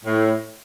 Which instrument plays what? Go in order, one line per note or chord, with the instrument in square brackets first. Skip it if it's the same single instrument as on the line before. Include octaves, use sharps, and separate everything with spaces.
[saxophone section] A2